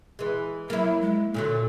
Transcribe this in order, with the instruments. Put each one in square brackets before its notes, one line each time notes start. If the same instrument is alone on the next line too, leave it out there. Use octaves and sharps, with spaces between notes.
[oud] E3 G#3
[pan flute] F#3 [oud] A#3 E4
[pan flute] G#3
[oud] A#2 D3 F#3 [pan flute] A4